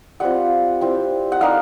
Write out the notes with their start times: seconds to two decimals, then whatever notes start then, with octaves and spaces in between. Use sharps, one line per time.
0.20 G3 C4 F4 F#5
0.81 G3 C4 E4
1.32 F#5
1.41 G3 A#3 D#4 F5